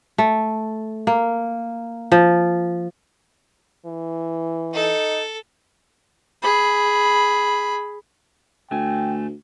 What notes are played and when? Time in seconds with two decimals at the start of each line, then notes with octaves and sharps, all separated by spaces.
0.18 A3
1.07 A#3
2.12 F3
3.86 E3
4.74 D#4 A4
6.42 G#4 B5
8.71 D2 A3 G5 G#5